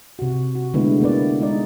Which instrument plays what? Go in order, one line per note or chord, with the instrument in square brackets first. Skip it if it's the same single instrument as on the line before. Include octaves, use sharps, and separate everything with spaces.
[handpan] C3 F#4
F#4
D3 G#3 A3 B3 E4
D3 A#3 B3 E4 D5
G#3 D#4 D5